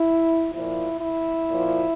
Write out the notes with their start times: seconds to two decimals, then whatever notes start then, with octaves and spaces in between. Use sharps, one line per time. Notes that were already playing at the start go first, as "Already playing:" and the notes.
Already playing: E4
0.52 A#2 F3 E4
1.01 E4
1.49 A#2 F3